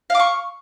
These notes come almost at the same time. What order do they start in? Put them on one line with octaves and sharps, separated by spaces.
F5 D6 C#6